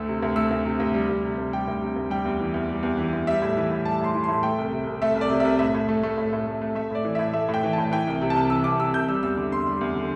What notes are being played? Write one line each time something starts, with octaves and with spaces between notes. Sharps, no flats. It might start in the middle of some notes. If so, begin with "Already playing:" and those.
Already playing: D2 A3 E6
C3
D2
A3 E6
D2
C3
D2
G3
D2
C3
D2
G3 G5
D2
C3
D2
G3 G5
E2
E3
E2
G3
E2
E3
E2
G3 E5
A2
E3
A2
G3 A5
A2 C6
E3
A2 C6
A3 G5
C2
C3
C2
A3 E5
C2
D5
C3
C2 E5
A2 E5
A2
A3
A3
A2
A2
A3
A3
A3 E5
A2 D5
E3
A2 E5
A3 E5
A2
G5
E3
A2 A5
E3 G5
C2
C3
A5
C2
E3 E6
C2 D6
C3 E6
C2 G6
G3 E6
E2 E6
D3 D6
E2 C6
G3
E2
D3